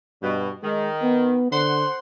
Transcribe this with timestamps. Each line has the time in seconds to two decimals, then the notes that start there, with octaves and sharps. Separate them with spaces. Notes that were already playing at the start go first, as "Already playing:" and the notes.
0.22 G2 B2
0.63 D#3 G#3
1.03 B3
1.52 D3 C5 F#5 C6